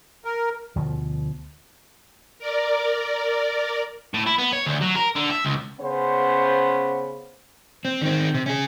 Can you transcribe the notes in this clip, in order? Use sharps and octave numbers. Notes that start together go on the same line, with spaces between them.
A#4
D2 B2 F3
A#4 D5
A2
E4
B3
C#5
D2
F#3
A#4
D3
E5
C#2
C#3 B3 C#4 C5
C4
D#3 C4
C3
C#4 G#4